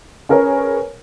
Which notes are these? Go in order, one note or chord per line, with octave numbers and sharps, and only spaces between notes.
C#4 G#4 A#4 B4 C#5